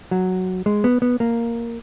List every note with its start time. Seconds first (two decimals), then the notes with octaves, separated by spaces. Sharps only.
0.11 F#3
0.66 G#3
0.84 B3
1.02 B3
1.20 A#3